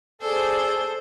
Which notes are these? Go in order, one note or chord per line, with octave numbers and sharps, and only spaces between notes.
G#4 A4 C5 D5